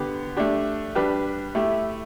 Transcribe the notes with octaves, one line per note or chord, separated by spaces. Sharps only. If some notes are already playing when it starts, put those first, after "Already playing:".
Already playing: D3 B3 G4
A3 D4 G4
G3 D4 G4 B4
A3 E4 G4